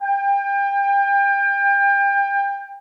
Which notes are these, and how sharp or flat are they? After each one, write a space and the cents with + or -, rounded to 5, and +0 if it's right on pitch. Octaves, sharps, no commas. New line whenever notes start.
G5 +30